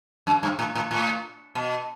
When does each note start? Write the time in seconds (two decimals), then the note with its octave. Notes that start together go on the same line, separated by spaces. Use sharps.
0.27 F#2
0.43 G2
0.59 A2
0.75 A2
0.91 A2
1.55 B2